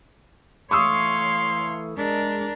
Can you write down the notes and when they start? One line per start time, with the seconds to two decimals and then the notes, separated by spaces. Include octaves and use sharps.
0.71 E3 A3 C#5 F5 C6 C#6 D#6 E6
1.97 G#3 D4 A#4